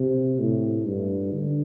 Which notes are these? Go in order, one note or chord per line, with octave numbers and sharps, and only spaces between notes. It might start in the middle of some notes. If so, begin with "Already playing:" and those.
Already playing: C3
A2
G2
D3